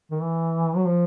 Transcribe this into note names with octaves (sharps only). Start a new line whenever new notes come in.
D#3
E3
F#3
F3